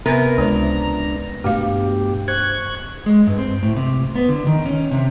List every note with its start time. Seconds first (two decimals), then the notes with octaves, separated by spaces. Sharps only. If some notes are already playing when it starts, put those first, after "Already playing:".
0.06 C3 B3 A#4 B4 G#5 A#5
0.38 C#2 G#3 D4 C5 A#5
1.44 G2 B2 A3 F#4 G4 F5
2.28 C5 C#6 F#6 G#6
3.06 G#3
3.27 G2
3.39 C4
3.63 A2
3.77 C3
4.16 B3
4.29 D3
4.47 D#3
4.66 C#4
4.91 C3